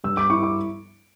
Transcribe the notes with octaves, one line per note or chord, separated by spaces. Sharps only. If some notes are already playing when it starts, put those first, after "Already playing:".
G2 E6
D6
E4 C#6
D6